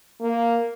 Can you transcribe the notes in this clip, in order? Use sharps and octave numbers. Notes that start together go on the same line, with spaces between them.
A#3